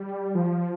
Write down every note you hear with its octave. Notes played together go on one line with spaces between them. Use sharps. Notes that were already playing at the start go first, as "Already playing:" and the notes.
Already playing: G3
F3